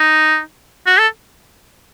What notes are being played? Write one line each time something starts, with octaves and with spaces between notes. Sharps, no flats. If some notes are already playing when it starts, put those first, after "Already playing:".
Already playing: D#4
F#4
A4